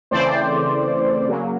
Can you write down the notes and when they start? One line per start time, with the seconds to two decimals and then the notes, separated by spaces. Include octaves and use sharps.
0.11 C#3 E3 A3 C4 C5 D5
1.27 C#3 F#3 A#3